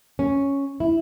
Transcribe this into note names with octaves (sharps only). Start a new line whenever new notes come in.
C#4
E4